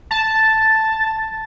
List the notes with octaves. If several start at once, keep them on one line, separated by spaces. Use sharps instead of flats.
A5